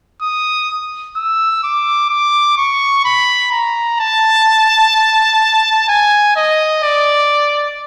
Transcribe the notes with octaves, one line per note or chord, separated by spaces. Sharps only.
D#6
E6
D6
D6
C#6
B5
A#5
A5
G#5
D#5
D5